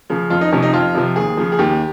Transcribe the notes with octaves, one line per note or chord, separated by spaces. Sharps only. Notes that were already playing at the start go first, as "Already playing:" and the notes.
C#3 F3
F2 F4
D#4
C3 F3 C#4
D#4
F2 F4
C3 F3
D#2 G#4
C#3 F3
G#4
D#2 G4